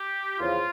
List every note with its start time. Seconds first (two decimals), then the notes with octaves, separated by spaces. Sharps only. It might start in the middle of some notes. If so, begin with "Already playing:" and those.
Already playing: G4
0.39 E2 C#3 F3 F4